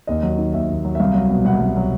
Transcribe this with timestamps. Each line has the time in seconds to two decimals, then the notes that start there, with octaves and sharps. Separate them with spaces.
0.07 D#2 D#5
0.23 F#3
0.38 D#3
0.53 D#2 E5
0.68 D#2
0.85 F#3
0.95 E5
1.00 C2 F5
1.15 F#3
1.30 B2
1.45 C2 F#5
1.60 C2
1.77 F#3